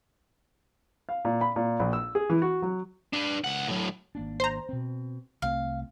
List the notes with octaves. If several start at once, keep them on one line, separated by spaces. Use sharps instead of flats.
F5
A#2
B5
A#2
A#1
E6
G#4
E3
F#4
F#3
D4 B4
C#2 F#5
A2 F#3
G#1 A#3 D4
C5 A#5
B2 C4
C2 A3 C4 F5